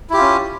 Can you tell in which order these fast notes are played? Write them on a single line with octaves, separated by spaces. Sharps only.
E4 G4 F4 C#4